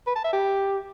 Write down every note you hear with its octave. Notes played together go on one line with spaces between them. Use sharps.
B4
A5
E5
G4